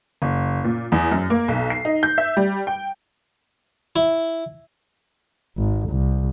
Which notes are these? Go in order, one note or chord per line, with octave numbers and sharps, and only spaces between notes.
F#1
A#2
E2
F#2
A#3
B1
C7
D#4
G6
E5
G3
G5
E4
G#1
C2